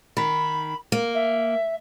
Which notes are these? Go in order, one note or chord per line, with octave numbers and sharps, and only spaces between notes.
D#3 B5
A#3
E5